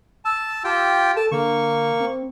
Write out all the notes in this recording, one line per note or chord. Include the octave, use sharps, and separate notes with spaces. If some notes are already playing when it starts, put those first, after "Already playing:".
A5 E6
F4 G4 G5
A4 A5
D3 A#3 C#6
C4